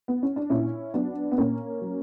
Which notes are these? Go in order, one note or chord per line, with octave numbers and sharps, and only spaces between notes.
B3
C#4
D4
A#2 C#4 E4
F#3 B3 D4
B3
A#2 A#3 C#4
F#3